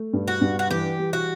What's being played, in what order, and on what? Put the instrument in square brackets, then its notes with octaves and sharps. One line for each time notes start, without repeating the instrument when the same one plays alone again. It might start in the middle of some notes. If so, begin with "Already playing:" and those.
Already playing: [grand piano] A3
G2
[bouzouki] F#4
[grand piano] G2
[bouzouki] F#4
[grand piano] E3 [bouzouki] G4
[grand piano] G3
[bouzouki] F#4